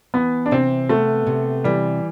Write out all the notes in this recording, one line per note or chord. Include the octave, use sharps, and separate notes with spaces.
E3 B3
D4
C3 C4
A3 B3
C3
E3 G3